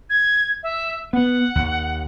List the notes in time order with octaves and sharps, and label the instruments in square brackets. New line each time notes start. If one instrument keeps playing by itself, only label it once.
[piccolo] G#6
E5
[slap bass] B3 [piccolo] F#5
[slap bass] D#2